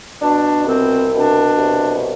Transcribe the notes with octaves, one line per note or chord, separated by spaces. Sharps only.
B2 D4
C2 C4
B2 D4
C2